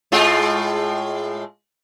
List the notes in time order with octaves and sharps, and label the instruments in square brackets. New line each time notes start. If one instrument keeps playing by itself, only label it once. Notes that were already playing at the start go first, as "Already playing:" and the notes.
[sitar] A2 G#3 F4